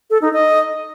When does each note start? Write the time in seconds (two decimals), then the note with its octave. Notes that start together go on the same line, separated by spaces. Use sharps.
0.10 A4
0.22 D#4
0.33 D#5